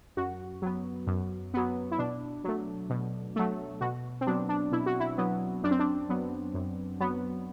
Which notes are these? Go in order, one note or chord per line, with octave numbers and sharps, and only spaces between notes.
F#2 F#4
F#3 B3
F#2
F#3 B3
E4
B2 D4
F#3 A3
B2
F#3 A3
B2 F#4
C4
F#3 B3 D4
D4
B2 E4
F#4
E4
F#3 B3
F#2 D4
C4
D4
F#3 B3
F#2
F#3 B3